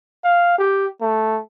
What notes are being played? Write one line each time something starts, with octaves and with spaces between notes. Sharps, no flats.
F5
G4
A3